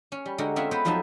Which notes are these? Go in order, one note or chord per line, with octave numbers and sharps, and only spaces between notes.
C#4
G3
D3 G#3 F#4 G4 A#4
C4 C#4 F4 G#4 E5 F#5
B3 C4 B4 C5
F2 F3 F#3 D#4 E5 A5